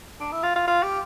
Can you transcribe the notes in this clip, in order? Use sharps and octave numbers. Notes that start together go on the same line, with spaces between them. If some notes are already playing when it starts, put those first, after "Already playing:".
D4
E4
F4
F4
F4
G4